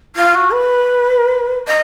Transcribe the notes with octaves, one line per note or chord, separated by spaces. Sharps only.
F4
F#4
B4
D#5